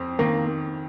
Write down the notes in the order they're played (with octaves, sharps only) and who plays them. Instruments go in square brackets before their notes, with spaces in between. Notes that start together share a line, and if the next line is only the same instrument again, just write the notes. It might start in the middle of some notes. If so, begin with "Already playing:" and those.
Already playing: [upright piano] F2 C4
[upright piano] D#3 [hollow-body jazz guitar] A#3